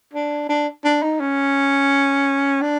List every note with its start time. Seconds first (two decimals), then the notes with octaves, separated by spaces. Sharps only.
0.13 D4
0.49 D4
0.84 D4
1.03 D#4
1.20 C#4
2.62 D4